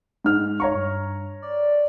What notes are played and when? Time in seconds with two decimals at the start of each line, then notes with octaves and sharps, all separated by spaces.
0.24 G#2 F6
0.60 C#5 A#5 C#6
0.74 G2
1.42 D5